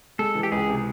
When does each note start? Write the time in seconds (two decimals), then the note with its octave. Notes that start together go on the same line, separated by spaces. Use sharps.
0.19 G#3 A4
0.35 E3
0.43 G4
0.52 C#2 G#4
0.69 C3